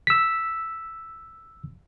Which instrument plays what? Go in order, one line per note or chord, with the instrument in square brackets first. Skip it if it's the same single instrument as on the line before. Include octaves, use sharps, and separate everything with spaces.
[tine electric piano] E6 B6